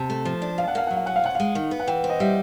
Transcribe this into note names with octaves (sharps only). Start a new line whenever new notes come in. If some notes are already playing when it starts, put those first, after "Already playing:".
Already playing: C3 A5
A3
F3
D4
B2 F5
F#5
A#3 F5
F#3 F#5
F5
C#4 F#5
F5
C3 F#5
G#3 F5
D#3
B3
F#5
E3 G5
C4
D#5
G3 E5